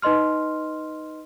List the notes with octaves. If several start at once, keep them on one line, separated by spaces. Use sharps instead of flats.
D#4 B4 D#5 C6 F6